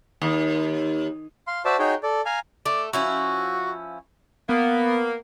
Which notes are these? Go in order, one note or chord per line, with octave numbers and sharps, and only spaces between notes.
D#2
F5 C6
F#4 C5 D5 E5 A5
D#4 F#4 G#4 C#5 G5
A4 D5
F5 G#5 A#5
A3 D5
F3 C#4 E4 F#4
A#3 B3